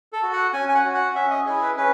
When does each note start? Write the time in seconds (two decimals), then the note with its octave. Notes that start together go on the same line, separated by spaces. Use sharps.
0.13 A4
0.23 F#4
0.33 F#5
0.53 C#4 G#5
0.69 G#5
0.75 F#5
0.85 F#4
0.95 F#5
1.15 C#4 E5
1.30 D#5
1.46 E4 G#4 D#5
1.61 B4
1.77 C#4 B4